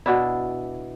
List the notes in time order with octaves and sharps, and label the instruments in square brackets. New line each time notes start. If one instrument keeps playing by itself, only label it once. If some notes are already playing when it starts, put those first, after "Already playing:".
[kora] B2 D4 E4